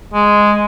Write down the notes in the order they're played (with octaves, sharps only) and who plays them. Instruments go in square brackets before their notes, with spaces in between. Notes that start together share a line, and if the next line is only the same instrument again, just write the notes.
[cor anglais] G#3